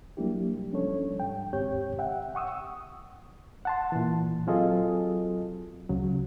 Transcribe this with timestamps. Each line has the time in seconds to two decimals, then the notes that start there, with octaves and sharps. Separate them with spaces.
0.17 F#3 G3 A#3 D4 E4 G4
0.71 F3 G3 C#4 D4 A4 C#5
1.20 G#2 G5
1.53 D#2 G#2 C4 G4 C#5 G6
1.99 E5 F#5 G5
2.35 F#5 C#6 D#6 E6
3.65 F#5 A5 C6
3.92 A#2 E3
4.47 F#3 C4 F4 G#4 A4 D#5
5.89 C#2 C#3 F#3